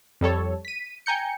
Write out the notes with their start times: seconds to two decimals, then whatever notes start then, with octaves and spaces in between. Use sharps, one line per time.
0.21 F2 G3 A4 C#5
0.65 B6 D#7
1.06 G5 G#5 A#5 G6 C#7